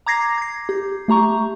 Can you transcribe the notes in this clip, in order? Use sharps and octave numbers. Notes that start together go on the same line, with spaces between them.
A#5 D6 G#6 A#6 C7
G#6 C7
G4
A3 G4 A#5 C#6